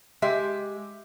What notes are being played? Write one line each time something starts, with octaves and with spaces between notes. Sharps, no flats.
G#3 G4 E5